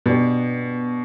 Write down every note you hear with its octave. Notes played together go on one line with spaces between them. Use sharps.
B2 B3 D4 G4